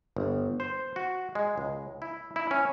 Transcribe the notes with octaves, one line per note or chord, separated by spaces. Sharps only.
G1
C5
F#4
G#3
C#2
E4
E4
C#4